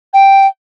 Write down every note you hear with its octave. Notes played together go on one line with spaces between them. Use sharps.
G5